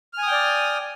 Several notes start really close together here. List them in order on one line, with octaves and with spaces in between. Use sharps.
F6 G#5 D#6 G5 D5